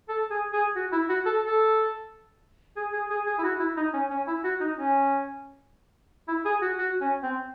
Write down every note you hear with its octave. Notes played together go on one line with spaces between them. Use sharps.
A4
G#4
G#4
F#4
E4
F#4
A4
A4
G#4
G#4
G#4
G#4
E4
F#4
E4
D#4
C#4
C#4
E4
F#4
D#4
C#4
E4
G#4
F#4
F#4
C#4
C4